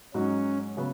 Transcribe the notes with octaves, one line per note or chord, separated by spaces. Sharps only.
G#2 F#3 C#4 D#4 F#4
C#3 F#3 B3